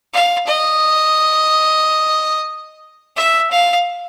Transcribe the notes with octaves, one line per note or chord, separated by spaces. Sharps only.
F5
D#5
E5
F5